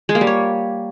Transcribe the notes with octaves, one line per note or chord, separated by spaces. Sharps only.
G#3
A#3
G3
C#5